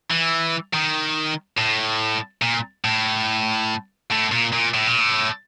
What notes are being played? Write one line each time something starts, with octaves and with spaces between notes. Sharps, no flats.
E3
D#3
A2
A#2
A2
A2
A#2
A#2
A2
A#2
A2